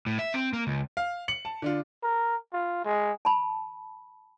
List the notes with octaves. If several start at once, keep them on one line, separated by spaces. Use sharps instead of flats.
A2
E5
C4
A#3
C#2
F5
C#7 F#7
A5
D3 D4 F4
A#4
F4
G#3
A5 B5